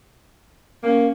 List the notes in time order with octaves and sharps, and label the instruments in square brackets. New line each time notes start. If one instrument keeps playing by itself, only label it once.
[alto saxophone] A#3 [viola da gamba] C#4